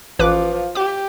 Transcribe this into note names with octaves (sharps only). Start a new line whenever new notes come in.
A1 F3 B4 D6
G4 D6